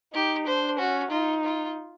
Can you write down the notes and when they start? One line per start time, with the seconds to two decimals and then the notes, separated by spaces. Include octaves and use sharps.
0.14 D#4 G4
0.46 D4 C5
0.78 C#4 F#4
1.11 D#4 F4
1.44 F4